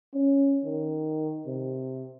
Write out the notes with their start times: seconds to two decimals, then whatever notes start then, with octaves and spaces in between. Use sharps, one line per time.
0.14 C#4
0.64 D#3
1.47 C3